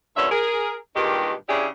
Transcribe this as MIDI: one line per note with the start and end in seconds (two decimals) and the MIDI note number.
0.17 0.30 43
0.17 0.30 46
0.17 0.30 50
0.17 0.30 61
0.17 0.30 76
0.31 0.75 68
0.31 0.75 70
0.96 1.32 43
0.96 1.32 46
0.96 1.32 51
0.96 1.32 56
0.96 1.32 67
1.49 1.67 49
1.49 1.67 61
1.49 1.67 62
1.49 1.67 64
1.49 1.67 67
1.49 1.67 68